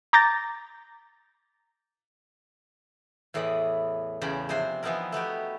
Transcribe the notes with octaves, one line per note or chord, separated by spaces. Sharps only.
A#5 D6 G6 A6 A#6
E2 A2 E3 D5 D#5 B5
E2 C#3 C#4 G5 B5
C3 F3 D4 C5 G#5
E3 F3 B3 D#4 E4 A#4
A3 B3 F#4 G4